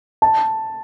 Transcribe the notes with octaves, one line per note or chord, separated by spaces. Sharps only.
A5